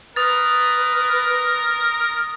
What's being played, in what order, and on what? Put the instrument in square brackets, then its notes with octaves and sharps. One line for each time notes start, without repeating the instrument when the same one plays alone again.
[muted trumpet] A#4 [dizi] B4 [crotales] D#6 A6